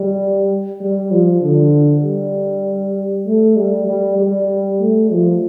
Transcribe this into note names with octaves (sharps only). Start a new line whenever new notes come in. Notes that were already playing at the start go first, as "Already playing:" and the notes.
Already playing: G3
G3
F3
D3
G3
A3
G3
G3
G3
A3
F3